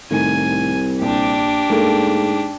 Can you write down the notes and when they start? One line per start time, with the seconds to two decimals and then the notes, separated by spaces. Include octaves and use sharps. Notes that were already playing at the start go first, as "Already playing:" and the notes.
0.11 C2 A2 D#3 G#5
1.01 A#1 D4 G4
1.70 G#2 A3 A#3